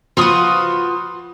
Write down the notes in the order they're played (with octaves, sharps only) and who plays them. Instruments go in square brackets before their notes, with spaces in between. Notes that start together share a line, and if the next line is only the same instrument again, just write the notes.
[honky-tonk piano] F3 C6 D#6 [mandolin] F4 F#4 B4